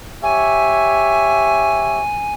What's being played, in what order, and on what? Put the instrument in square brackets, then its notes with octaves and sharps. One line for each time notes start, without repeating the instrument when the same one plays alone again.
[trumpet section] G4 C#5 E5 [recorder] G#5